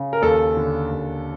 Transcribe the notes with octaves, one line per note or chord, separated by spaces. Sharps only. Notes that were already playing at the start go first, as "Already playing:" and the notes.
Already playing: C#3
A#4
D#2 A4
D3
D#2